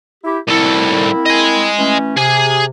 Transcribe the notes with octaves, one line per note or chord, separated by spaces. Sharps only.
E4 G4
C2 A#3 C4 E4 A4
D#5 G#5
E3 A3 C#4
C3 G#4 G#5